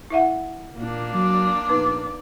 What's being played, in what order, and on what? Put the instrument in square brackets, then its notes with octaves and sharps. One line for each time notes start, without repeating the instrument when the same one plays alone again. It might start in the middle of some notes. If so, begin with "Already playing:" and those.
[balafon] E4 E5 F#5
[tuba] A#2 [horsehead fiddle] A#3 D4
[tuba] F#3 [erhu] D5
[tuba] A#1 [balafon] B3 D#4 B4